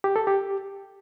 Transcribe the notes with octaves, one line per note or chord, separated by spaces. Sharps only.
G4
A4
G4